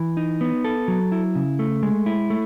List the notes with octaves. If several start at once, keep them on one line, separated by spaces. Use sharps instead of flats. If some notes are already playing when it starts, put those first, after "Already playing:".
Already playing: E3
D#4
B3
A4
F#3
E4
C#3
A3
G#3
E4
A3